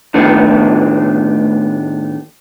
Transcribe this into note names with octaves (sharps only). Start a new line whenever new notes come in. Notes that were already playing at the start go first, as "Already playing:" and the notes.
A2 D#3 A3 B3 D4